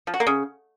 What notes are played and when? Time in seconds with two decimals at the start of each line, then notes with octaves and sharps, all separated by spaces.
0.07 F3
0.14 F#4
0.20 A#3
0.27 C#3